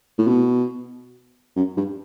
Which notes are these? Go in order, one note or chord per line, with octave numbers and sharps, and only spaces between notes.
A2
B2
F#2
G2